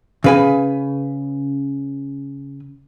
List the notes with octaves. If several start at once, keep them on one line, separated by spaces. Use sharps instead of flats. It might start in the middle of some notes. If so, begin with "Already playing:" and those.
C#3 B4 G#5